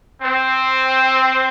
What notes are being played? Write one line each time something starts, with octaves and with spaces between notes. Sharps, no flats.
C4